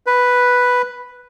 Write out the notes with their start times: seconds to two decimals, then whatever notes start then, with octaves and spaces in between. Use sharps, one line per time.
0.06 B4